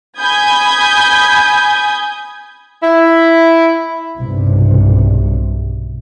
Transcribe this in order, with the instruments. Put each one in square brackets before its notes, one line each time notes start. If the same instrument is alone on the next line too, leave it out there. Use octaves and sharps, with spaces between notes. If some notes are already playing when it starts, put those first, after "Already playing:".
[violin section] G#5 B5 D#6 G6 G#6
[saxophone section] E4
[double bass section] B1 G2 C3